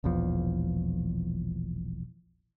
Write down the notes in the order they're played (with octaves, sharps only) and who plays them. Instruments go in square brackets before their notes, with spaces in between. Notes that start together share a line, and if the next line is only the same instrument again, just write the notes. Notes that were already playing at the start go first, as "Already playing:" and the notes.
[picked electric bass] E1 A#1 E2 F3